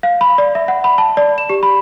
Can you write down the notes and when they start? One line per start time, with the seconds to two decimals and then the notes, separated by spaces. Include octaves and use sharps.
0.03 F5
0.21 B5
0.38 D5
0.55 E5
0.68 F#5
0.84 B5
0.98 A5
1.17 D5
1.38 E7
1.49 G4
1.63 B5